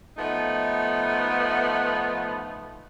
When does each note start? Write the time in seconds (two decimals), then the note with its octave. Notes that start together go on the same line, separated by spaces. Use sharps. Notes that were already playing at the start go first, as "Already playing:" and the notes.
0.17 F3 A3 B3 D#4